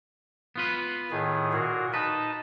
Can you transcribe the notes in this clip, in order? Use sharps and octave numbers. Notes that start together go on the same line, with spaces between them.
B3 F4 B4
A2 D#3 G#4
A#2 F#4 A#4
D#4 B4 D#5 A5